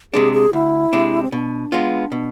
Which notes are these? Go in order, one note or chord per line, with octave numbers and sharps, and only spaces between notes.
C3 G#3 D4 G#4
G#4
D2 E4
C3 G#3 D4
C4
B2 D4
G#3 B3 F4
B2